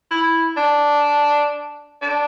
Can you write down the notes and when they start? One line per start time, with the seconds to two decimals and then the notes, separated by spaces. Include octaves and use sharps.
0.11 E4
0.57 D4
2.02 D4